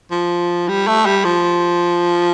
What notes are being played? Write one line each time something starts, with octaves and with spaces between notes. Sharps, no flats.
F3
G3
A3
G3
F3